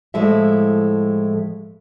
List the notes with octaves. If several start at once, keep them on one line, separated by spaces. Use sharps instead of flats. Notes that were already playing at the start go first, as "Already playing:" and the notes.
A2 F3 G#3 E4 A4 E5